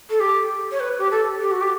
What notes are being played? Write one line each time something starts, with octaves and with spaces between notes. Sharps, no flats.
A4
G4
C#5
B4
G4
A4
G4
F#4
G4